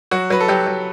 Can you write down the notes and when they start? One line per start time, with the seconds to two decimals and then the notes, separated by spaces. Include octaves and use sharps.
0.11 F#3 F#4
0.30 F#3 B4
0.40 A4
0.48 F#3 G4
0.67 F#3